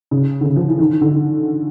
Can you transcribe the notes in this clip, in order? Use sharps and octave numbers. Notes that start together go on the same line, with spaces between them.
C#3
D3
C#3
F3
E3
D#3
D3